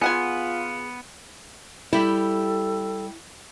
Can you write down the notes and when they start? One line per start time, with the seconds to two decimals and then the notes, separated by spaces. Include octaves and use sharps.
0.01 B3 F4 G#4 F#5 G#5
1.93 G3 E4 G4 A4